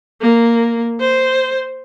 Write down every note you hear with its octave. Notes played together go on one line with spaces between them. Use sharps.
A#3
C5